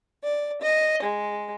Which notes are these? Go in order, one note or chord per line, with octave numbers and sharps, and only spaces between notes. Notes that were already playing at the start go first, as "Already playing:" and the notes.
D5
D#5
G#3